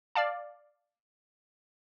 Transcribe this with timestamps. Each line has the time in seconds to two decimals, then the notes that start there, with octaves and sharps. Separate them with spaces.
0.15 D5 F5 A5